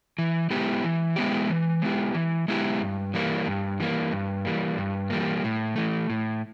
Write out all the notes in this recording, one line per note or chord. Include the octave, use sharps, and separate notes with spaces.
E3
G#3 B3 E4 G4
E3
G#3 B3 E4 G4
E3
G#3 B3 E4 G4
E3
G#3 B3 E4 G4
G2
E3 G3 A#3
G2
E3 G3 A#3
G2
E3 G3 A#3
G2
E3 G3 A#3
A2
E3 A3
A2